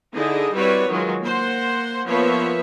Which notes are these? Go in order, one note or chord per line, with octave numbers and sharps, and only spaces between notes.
D3 D#4 E4 G#4 D#5
G3 C4 E4 F#4 B4 C#5
D#3 F#3 G#3 F4
A#3 C5 F#5
F3 A#3 B3 B4 C#5 E5